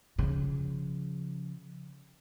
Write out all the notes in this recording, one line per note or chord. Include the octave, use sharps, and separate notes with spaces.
C#3 F3